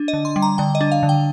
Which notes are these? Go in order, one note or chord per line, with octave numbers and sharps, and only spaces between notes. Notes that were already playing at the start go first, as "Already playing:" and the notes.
Already playing: D4
D#5
D3
C6
G3
A#5
D3 G5
D#5
D4
F5
D3
G5